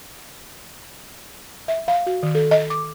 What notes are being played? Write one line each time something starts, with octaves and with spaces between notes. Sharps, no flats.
E5
F5
F#4
D#3
A4
D#5
D6